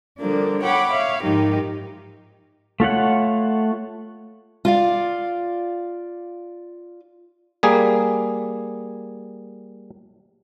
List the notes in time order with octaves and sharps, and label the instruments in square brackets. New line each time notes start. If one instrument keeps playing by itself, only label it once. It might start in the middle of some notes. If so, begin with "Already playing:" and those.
[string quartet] D3 F3 G3 A#3 D4
C#5 F#5 G5 B5 D6
C#5 E5 F5
G#2 D#3 F3 D#4 G4
[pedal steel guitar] A3 F4 C#5 F#5
[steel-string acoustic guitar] F4 D5 F5
[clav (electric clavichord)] G3 A#3 G#4